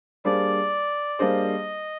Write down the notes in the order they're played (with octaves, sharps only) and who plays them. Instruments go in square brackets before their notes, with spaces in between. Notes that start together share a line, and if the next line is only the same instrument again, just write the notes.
[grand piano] G3 A#3 D4 G#4 C5 [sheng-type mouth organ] D5
[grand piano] G3 A#3 D4 G#4 C5 [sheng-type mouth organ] D#5